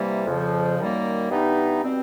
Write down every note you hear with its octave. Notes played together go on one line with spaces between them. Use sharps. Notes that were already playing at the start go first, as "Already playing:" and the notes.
Already playing: C3 E3 G3 A#3
F2 C#3 F3
F#2 D#3 G3 A#3
G2 E3 G3 B3 D#4
B2 G3 C4